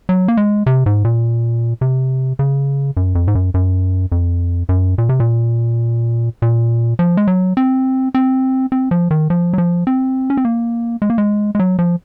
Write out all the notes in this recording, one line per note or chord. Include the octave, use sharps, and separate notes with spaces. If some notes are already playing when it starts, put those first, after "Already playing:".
F#3
A#3
G#3
C3
G#2
A#2
C3
C#3
F#2
F2
G#2
F#2
F#2
F2
F#2
A#2
C3
A#2
A#2
F3
G#3
F#3
C4
C4
C4
F3
D#3
F3
F#3
F3
C4
C#4
C4
A#3
G#3
A#3
G#3
G#3
F#3
F3